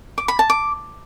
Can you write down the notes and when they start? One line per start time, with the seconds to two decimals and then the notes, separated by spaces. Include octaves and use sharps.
0.18 D6
0.28 B5
0.39 A5
0.50 D6